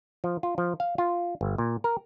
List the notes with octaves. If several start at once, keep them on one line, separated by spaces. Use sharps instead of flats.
F3
F4
F3
F5
F4
G1
A#2
A#4